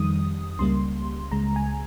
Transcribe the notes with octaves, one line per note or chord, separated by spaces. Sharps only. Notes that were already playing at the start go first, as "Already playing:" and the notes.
Already playing: F2 D#3 G3 D#6
C#2 C#3 G3 A#3 C6
C#2 C#3 G#3 A#5
G#5